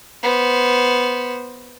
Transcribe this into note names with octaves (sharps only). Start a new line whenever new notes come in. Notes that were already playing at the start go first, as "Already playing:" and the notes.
B3 C5